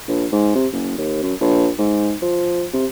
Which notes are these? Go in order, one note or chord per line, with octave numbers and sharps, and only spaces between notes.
A#1
G#2
C3
F#1
D#2
F#2
A#1
G#2
F3
C3